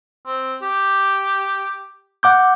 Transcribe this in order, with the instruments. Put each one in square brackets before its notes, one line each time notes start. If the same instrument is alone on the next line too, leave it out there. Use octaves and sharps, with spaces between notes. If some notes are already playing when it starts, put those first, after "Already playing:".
[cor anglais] C4
G4
[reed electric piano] F#5 D6 G6